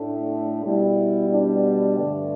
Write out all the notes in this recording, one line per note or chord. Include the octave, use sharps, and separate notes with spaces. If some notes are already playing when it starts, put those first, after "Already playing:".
Already playing: A2 A3 D4
B2 G3 B3 E4
D4
G2 D3 A3